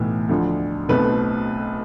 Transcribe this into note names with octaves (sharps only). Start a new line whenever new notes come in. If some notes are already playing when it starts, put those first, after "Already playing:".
Already playing: B1 A2 E3 B3
D2 D3 F3
B1 B2 A3 C4 B4